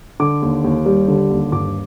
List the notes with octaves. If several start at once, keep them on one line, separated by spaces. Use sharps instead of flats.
D3 D6
D#2
D#2
G3
D3
D#2
G2 D6